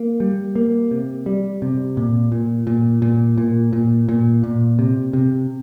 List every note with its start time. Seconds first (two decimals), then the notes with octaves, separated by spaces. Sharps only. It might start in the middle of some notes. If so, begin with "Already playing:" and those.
Already playing: A#3
0.20 G3
0.56 A#3
0.91 C3
1.26 G3
1.62 C3
1.97 A#2
2.32 A#2
2.67 A#2
3.02 A#2
3.38 A#2
3.73 A#2
4.09 A#2
4.44 A#2
4.79 C3
5.13 C3